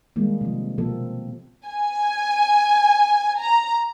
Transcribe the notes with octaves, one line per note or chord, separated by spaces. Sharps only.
D#3 G3 G#3 A#3
C3 F3
B2 F3 A#3 C4 A4
G#5
A#5